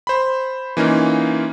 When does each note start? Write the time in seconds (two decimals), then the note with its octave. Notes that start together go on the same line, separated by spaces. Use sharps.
0.07 C5 B5
0.77 E3 A#3 C#4 D#4 F4